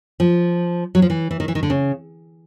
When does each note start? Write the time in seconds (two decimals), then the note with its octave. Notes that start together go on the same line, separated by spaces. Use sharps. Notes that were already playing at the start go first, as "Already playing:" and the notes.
0.20 F3
0.95 F#3
1.02 F3
1.10 E3
1.31 E3
1.40 D#3
1.48 E3
1.55 D#3
1.63 D3
1.70 C#3